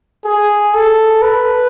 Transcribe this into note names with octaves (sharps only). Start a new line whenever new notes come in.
G#4
A4
B4